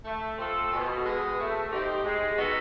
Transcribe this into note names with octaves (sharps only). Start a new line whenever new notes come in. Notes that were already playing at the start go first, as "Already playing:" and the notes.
A3
C4 F4 A4
B2
G#3 B3
A3
C4 D#4 G4
G#3
B3 D#4 F#4 A4